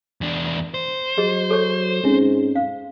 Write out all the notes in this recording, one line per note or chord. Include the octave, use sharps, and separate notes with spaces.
E2 D4
C5
F#3 G#4 D#5
A4 C#5 C#6
G#2 C4 C#4
F5